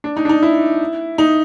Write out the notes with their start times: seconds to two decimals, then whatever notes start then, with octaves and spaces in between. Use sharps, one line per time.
0.04 D4
0.17 D#4
0.25 D4
0.29 D#4
0.43 E4
1.18 D#4